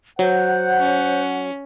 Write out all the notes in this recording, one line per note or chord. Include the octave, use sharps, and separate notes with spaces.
F#3 C5 F#5
C#4